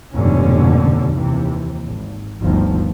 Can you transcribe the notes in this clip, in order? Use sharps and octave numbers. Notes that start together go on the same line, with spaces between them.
F1 D#2 G#2 B2 D3 C#4
D#2 C3 E3
G#1
G1 D2 D#3 F3